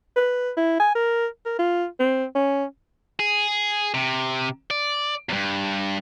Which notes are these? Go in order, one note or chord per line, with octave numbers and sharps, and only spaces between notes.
B4
E4
G#5
A#4
A#4
F4
C4
C#4
G#4
C3
D5
E2 G2